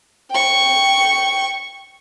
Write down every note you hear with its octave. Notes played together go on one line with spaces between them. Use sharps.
G5 C#6